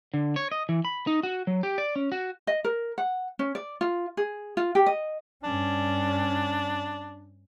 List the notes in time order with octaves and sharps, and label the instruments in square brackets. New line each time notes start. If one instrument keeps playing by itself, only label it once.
[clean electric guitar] D3
C#5
D#5
E3
B5
D#4
F#4
F#3
G4
D5
C#4
F#4
[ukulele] D#5
A#4
F#5
C#4
D5
F4
G#4
F4
G4
D#5
[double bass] G2 C#4 [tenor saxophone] D4